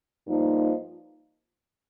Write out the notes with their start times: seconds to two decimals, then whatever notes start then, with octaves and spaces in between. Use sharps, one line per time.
0.27 G2 F3 A#3 D#4